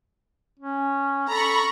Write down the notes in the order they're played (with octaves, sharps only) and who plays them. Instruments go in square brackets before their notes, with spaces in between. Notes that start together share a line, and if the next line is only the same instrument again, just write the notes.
[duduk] C#4
[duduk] A4 [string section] A#5 B5 C#6